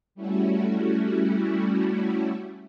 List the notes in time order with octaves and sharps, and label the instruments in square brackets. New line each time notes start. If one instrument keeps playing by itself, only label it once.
[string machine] G3 A3 C#4 E4 F#4